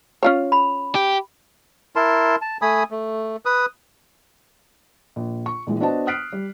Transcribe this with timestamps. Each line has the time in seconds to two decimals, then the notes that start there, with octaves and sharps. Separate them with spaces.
0.23 C#4 F4 C#5
0.52 B5
0.95 G4
1.96 E4 A#4 A5 C6
2.42 A5
2.62 A3 G#5 B5 D#6
2.91 A3
3.45 B4 D#6
5.16 A#1
5.46 C#6
5.67 A#1 E3 G#3
5.80 B3 D4 F#4 C5 D#5 A5
6.07 D#6 F6 F#6 B6 C7 D7
6.33 G3